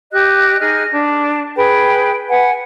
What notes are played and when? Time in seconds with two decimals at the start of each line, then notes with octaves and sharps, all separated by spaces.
0.11 G4 D#5 F#6
0.60 D#4 G#4 D#5 F6
0.91 D4
1.56 G#4 B4 G5
2.29 B4 F#5 G#5